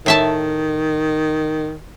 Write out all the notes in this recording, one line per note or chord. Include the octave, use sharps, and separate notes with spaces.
A2 D#3 E5 A5